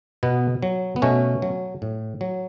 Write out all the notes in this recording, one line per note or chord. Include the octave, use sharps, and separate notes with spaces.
B2 B3
F#3
B3
B2 A3 C#4
F#3
A2
F#3